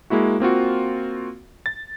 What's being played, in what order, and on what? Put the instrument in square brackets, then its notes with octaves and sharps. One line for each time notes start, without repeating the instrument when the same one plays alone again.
[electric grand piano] G#3 A#3 E4 F#4
A#3 C4 F4 F#4
A6